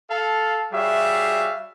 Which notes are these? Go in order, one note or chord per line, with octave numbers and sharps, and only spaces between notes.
A4 F5 A5
G3 F#4 G#4 C#5 E5 F5